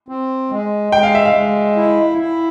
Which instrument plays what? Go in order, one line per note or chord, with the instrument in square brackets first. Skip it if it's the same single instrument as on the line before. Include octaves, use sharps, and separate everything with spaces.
[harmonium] C4
G#3
[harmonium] G#3 [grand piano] G5
[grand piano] F5
E5
F5
[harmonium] G#3
E4
E4